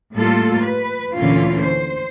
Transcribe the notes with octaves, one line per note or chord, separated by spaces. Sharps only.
A2 G3 A#3 F4 A4
B4
D2 A#2 D3 E3 C#4 F4
C5